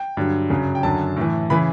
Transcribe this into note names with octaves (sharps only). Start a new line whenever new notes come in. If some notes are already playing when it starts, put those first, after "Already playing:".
Already playing: G5
G2 D3 F#3
F#2 C#3 F#3
G5
F#2 D3 F#3 A5
A2 E3
C#3 E3 B5